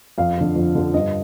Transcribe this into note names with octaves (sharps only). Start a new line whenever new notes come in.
F2 F5
D3 F3
F2
D3 F3
G2 D#5